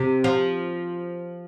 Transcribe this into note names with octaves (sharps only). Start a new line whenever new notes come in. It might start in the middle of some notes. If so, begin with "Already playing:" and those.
Already playing: C3
F3